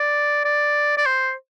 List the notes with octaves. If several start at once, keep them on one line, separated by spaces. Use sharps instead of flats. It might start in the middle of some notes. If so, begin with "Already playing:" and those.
Already playing: D5
D5
D5
C5